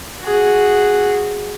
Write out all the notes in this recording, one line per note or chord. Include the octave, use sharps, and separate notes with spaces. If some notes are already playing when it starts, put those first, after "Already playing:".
F#4 G#4